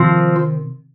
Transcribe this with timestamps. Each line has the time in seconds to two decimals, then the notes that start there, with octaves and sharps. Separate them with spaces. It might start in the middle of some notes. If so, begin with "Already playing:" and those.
Already playing: C3 D#3 F3 C4